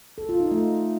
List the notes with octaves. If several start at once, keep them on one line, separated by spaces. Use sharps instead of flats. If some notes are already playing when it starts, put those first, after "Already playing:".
A4
F4
D#4
A3